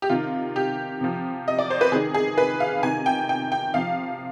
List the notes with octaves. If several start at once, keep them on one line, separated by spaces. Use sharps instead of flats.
G4
C3 D#3 F4
G4
C3 F3
D#5
D5
C5
B4
C3 D#3 G#4
G#4
B4
F5
C3 D#3 G#5
G5
G5
G5
C3 F3 F5